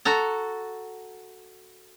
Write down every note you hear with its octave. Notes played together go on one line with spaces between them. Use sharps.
F#4 A4 A#5